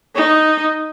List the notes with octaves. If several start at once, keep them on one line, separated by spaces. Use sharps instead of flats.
D#4